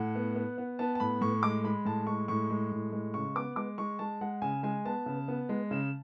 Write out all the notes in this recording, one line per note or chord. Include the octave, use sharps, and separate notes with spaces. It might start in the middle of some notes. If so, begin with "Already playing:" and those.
Already playing: A2 F#5
B3
B3
B3
B3 A5
A5
A2 B5
A2 C#6
G#3 D6
G#3 B5
A2 A5
G#3 C#6
A2 C#6
G#3
A2
G#3
C#3 C#6
B3 D6
G#3 D6
G#3 C#6
G#3 A5
G#3 F#5
C#3 G#5
G#3 G#5
B3 A5
C#3
B3
G#3
C#3